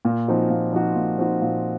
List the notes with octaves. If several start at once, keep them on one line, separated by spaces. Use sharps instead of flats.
A#2
F3 C4 D#4 F#4
A#2
F3 C4 D#4 F#4
A#2
F3 C4 D#4 F#4
A#2